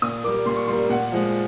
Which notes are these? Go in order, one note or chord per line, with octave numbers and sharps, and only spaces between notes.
A#2 D#6
G3 A#3 D6
A#2 C6
C#6
G3 A#3 C6
A#2 F#5
F3 G#3